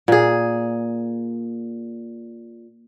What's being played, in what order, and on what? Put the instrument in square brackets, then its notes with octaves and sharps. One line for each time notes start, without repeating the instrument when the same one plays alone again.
[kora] A#2 G#4